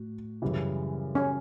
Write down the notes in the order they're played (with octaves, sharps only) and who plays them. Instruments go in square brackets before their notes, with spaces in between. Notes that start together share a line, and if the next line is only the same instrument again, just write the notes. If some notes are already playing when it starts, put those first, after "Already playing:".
Already playing: [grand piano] A2 F#4
F#2 C#3 E3 G3
[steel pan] C#4